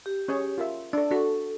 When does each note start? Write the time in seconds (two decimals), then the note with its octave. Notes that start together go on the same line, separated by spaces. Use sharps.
0.06 G4
0.28 C#4 G#4 C#5
0.58 F4 A#4 E5
0.93 D4 A4 D5
1.11 D4 F#4 A4